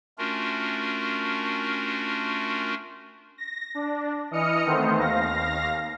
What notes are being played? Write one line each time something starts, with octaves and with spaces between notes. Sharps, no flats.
A3 C#4 D4 F4 F#4 A#4
A#6
D4
E3 D#5 D#6 F6 C#7
D#3 A3 B3 C4 C5
D#2 F5 A#6